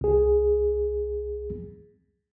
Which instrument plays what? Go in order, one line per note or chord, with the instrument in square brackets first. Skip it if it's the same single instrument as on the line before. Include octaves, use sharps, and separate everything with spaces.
[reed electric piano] C2 G#4